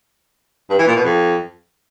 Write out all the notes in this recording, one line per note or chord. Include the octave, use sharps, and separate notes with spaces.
G2
E3
A#2
B2
F2